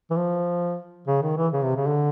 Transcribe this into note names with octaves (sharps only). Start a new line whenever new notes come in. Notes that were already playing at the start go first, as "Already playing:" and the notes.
E3
F3
C#3
D#3
E3
C#3
C3
C#3
D3